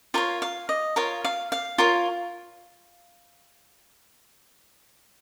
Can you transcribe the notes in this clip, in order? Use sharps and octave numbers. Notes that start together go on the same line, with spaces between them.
F4 A#4 C#5 F5
F5
D#5
F4 A#4 C#5 F5
F5
F5
F4 A#4 C#5